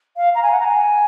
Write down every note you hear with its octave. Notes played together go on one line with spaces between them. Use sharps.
F5
A#5
G#5
F#5
A#5
G#5